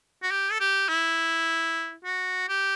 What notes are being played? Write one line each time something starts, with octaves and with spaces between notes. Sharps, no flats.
F#4
G4
A4
G4
E4
F#4
G4